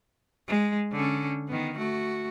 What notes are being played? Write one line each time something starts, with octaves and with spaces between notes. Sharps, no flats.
G#3
D3 C#4
D#3 B3
A3 F#4